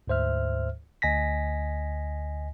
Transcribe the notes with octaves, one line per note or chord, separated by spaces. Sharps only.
D2 G#2 C5 E5 F6
D2 D#5 G#5 A#6 B6